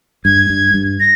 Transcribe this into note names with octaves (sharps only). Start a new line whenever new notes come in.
G2 G#6
G2
G2
A#6